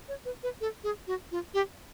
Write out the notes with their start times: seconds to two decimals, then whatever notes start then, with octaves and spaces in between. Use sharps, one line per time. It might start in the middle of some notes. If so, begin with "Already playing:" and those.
0.08 C#5
0.25 B4
0.43 B4
0.61 A4
0.84 G#4
1.07 F#4
1.32 F4
1.54 G4